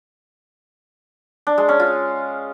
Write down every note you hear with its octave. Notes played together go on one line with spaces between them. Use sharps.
D4
G#3
C#4
F4